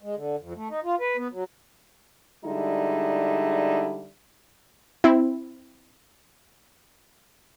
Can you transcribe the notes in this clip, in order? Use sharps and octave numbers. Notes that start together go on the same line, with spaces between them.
G#3
D3
F2
A3
D#4
F4
B4
B3
F#3
D3 G3 G#3 D#4 E4
C4 E4